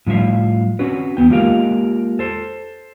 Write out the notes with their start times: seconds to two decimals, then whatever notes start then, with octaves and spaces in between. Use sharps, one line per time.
0.07 A2 F3 G3 E5 F5
0.79 C4 C#4 F#4 B4
1.17 E2 G#2 B3 G5
1.30 G#3 A#3 F4 G4 A#4 F5
2.19 A4 C5